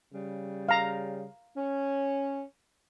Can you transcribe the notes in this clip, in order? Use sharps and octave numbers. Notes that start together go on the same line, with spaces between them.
C#3 G3
F5 A#5
C#4